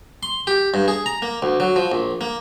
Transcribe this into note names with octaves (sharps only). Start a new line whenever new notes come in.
C6
G4
G2
G#4
A#5
A#3
D2
F#3
F3
A#1
A#3